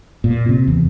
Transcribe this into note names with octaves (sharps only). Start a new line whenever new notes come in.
A#2
C3
E2